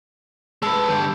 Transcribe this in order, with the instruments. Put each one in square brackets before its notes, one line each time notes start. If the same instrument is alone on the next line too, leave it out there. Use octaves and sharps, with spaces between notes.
[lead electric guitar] G#3 B4 [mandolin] A4
[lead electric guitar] D3 G3